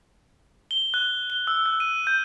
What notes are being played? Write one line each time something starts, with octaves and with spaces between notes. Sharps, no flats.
G7
F#6
G7
E6
F#6
D#7
G6